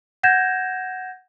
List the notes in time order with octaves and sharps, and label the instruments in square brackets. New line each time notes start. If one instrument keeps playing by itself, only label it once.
[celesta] F#5 G6 G#6 A#6 E7